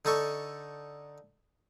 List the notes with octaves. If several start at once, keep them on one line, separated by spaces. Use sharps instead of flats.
D3 D#4 A4 C#6